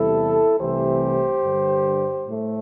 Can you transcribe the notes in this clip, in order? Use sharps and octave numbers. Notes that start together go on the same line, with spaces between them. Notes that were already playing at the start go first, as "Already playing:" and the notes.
Already playing: E2 C3 G3 E4 A4
C2 C3 E3 A3 G4 C5
G2 D3 G3
A2 A3